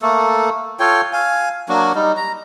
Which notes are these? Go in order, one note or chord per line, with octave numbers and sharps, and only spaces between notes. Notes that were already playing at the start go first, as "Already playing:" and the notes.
A3 A#3 A4
F4 A4 C#5 G5
F5 G#5
F#3 A#3 D4 F#4
G3 D#4
A#5